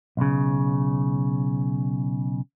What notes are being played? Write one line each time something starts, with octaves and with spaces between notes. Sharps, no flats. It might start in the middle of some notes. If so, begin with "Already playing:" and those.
B1 C#3